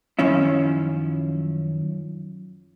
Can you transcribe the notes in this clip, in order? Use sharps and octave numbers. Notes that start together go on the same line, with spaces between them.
F#2 D#3 F3 C#4 E4